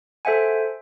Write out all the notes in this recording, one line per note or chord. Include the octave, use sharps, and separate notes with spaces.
A4 C5 E5 F#5 G#5